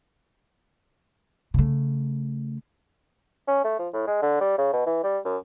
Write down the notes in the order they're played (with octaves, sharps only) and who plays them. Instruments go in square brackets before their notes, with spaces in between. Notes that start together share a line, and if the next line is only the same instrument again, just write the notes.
[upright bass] C#3 A3
[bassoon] C#4
A3
F3
A2
G#3
D3
G3
C#3
B2
E3
G3
F#2